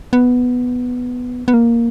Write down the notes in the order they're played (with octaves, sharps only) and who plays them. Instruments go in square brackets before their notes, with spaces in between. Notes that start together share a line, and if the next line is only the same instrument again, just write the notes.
[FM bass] B3
B3
A#3